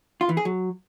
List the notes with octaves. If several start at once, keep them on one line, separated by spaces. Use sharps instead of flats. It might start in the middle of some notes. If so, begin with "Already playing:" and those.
F4
E3
G#4
F#3